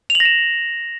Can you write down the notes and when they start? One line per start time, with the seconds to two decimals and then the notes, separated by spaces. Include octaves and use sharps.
0.10 F7
0.15 F#7
0.20 A#6
0.25 E7